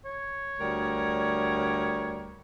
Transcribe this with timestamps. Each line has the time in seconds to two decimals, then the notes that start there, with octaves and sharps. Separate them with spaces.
0.05 C#5
0.59 D2 G3 A#4